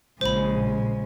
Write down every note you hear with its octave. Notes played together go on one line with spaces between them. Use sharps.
A#1 C#3 G#3 C5 B5